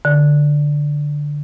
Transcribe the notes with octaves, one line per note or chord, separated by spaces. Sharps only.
D3